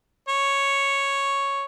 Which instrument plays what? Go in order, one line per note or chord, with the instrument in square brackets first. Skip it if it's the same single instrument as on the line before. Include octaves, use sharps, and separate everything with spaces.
[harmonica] C#5